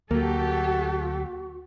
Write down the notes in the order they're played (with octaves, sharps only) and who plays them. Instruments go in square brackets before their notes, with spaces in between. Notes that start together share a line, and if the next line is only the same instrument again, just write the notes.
[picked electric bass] D2 F#3 [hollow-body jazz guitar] A#3 [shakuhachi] F#4 [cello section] G4 A4